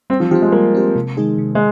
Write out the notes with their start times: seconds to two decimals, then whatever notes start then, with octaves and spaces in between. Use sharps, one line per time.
0.10 G3 C4
0.20 F3
0.31 F3 G4
0.35 C4
0.42 G#3
0.52 G3 A#3
0.75 C4 G4
0.96 C3
1.17 D#3 G#3 D#4 G#4
1.38 C3
1.55 G#3